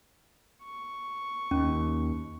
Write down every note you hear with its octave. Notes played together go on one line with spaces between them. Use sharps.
C#6
D#2 C#4